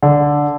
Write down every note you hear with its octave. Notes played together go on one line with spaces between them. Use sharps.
D3